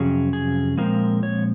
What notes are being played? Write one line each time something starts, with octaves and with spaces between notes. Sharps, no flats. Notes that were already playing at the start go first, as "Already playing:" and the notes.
Already playing: F2 C3 F#3 C#4 G#4
G#4
A#2 F3 G#3 C4 A#4
C#5